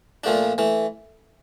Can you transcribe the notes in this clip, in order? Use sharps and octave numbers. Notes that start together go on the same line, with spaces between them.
A#2 F3 A3 D4
E3 A3